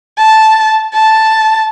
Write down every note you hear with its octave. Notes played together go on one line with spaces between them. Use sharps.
A5
A5